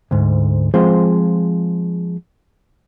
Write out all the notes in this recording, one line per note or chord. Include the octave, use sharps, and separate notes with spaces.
D2 G#2
F3 G#3 C4 F4 G#4 C5